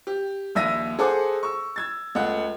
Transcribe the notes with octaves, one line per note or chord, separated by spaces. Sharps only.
G4
A#1 D#2 E5 E6 A#6 D#7
G#4 A4 C5 F#5 D6
C#6 E6
E6 G#6 A6
C#2 A3 F#5